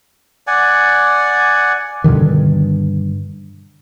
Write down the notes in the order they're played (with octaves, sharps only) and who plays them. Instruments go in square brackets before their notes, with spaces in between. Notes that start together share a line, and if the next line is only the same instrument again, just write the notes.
[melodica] D5 F#5 G#5
[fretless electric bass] G2 B2 D3 D#3